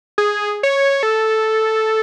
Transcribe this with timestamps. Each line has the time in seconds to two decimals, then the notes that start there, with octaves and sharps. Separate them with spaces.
0.18 G#4
0.63 C#5
1.03 A4